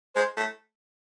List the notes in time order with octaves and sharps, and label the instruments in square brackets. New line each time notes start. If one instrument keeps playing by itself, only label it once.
[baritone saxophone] G#3 [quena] C5
[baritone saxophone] A3